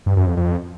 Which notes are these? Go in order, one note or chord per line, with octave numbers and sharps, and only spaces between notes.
G2
F#2
F2
F2